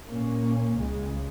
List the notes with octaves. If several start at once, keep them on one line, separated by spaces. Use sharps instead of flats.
A#2 A#3 C#4
C#2 C#3 G#3